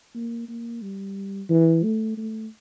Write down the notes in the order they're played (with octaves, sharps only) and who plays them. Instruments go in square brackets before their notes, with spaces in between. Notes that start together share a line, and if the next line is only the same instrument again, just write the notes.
[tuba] A#3
A#3
G3
E3
A3
A3